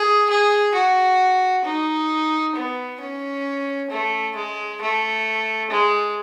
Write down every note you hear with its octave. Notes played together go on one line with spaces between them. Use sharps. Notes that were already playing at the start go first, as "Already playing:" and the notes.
Already playing: G#4
G#4
F#4
D#4
B3
C#4
A3
G#3
A3
G#3